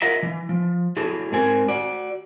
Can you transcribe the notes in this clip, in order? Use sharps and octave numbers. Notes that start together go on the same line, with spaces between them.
F4 A#4 D#5 E5 F#5
E3
F3
F#3 E4 F#4 G#4 A4
G#2 C4 A#4 G#5
F#4 D5